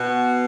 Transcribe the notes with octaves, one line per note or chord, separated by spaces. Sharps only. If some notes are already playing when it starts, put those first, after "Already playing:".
Already playing: B2 F#4